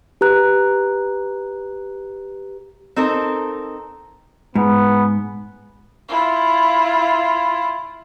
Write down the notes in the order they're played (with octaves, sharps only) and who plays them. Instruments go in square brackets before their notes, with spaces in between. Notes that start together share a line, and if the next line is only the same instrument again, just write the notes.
[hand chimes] G4 B4 A#5 F#6
[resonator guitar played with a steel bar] C4 D#4 A4 A#4
[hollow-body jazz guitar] G#2 [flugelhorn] B3
[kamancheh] E4 F4